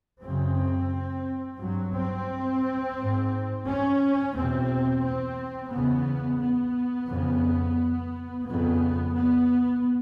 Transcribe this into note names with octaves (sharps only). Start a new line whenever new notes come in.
F#2 C#3 C4
G2 F#3
C4
G#2
C#4
E2 B2 C4
C4
E2 C#3 B3
B3
F2 C#3
F2 C#3 B3
B3